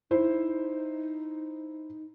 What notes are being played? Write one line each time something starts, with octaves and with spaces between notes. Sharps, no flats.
D#4 E4 C5